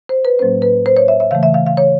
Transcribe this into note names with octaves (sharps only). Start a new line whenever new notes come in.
C5
B4
A2 F#3 A#3 C#4 C5
B4
C5
C#5
E5
E5
C#3 E3 A3 F5
E5
F5
F5
C#5